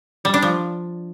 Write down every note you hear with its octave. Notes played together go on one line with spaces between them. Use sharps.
G3
D4
F3